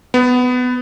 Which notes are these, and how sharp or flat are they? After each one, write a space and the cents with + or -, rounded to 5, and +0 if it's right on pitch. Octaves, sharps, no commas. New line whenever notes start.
B3 +15